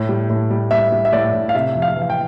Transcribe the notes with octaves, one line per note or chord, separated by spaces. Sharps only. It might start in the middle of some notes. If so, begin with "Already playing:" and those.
Already playing: A2
G3
A2
G3
G3 E5
G3
E5
A2 D5
A2
F5
C3 E5
F2
F5
E3
F5
G5